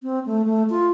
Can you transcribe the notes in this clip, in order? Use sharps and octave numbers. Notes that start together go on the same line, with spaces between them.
C4
A3
A3
F4